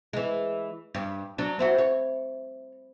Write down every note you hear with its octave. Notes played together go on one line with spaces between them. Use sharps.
E3 G#3
G2
F#3 D4
C4 E4 F#4
C#5